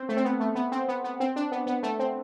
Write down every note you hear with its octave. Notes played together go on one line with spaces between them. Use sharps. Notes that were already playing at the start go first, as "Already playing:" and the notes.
Already playing: C4
A3
C4
B3
A3
B3
C4
B3
B3
C4
D4
B3
B3
A3
C4